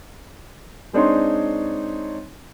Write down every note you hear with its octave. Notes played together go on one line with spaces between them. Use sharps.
G#3 C4 D4 D#4 C#5 C6